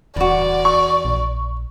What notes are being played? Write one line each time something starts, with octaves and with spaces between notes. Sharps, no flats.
D1 E2 F#4 D5
C#6
A#1